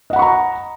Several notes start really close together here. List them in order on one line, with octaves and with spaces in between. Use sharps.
D#5 F#5 B5 C#6 A#5